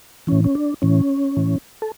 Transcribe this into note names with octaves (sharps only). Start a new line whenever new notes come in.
A2 E3 C#4
C#4
D4
A2 E3 C#4
A2 E3
A4